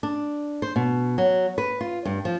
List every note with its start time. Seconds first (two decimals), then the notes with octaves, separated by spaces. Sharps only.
0.03 D4
0.62 C5
0.76 B2
1.18 F#3
1.58 B4
1.81 F4
2.05 G2
2.25 F3